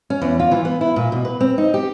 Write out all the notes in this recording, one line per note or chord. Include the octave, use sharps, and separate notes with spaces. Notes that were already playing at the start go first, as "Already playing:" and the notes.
C#4
E2
F4
E3
B3
E4
A#2
B2
B4
C4
D#4
G4